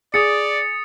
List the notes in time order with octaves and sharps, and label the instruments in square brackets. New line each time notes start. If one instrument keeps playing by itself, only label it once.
[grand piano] G#4 [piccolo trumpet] D5 [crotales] D#6 A6 C#7